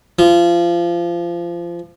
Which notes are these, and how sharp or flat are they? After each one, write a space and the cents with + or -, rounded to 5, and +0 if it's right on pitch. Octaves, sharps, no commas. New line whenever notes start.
F3 -25